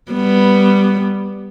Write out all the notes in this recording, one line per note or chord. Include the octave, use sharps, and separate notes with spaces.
G3 B3